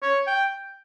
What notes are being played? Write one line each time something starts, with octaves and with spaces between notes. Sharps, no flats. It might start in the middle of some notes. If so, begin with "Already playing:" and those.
C#5
G5